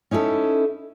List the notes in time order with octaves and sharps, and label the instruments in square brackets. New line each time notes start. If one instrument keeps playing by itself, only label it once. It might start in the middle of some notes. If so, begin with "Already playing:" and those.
[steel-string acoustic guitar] C#4 D#4 E4 G4 A4